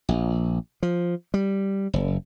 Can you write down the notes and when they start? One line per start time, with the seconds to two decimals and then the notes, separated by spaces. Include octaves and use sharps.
0.09 A#1
0.83 F3
1.34 G3
1.93 F#1